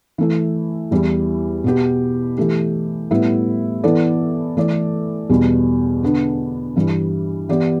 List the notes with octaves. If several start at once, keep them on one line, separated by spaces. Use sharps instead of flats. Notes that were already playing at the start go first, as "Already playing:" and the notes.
E3 A3 E4
E2 E3 G3 E4
B2 B3 G4
E3 A3 G4
A2 G3 B3 E4 B4
E3 B3 E4 A4 D5
E3 A3 E4 A4 D5
E2 B2 G3
D3 B3 D4
G2 E3 G3
E3 B3 E4 G4 D5